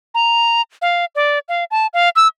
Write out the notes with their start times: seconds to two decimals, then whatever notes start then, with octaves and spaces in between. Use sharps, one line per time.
0.15 A#5
0.82 F5
1.15 D5
1.49 F5
1.71 A5
1.94 F5
2.16 E6